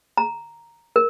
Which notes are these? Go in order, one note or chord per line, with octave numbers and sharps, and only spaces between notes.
A#5
A#4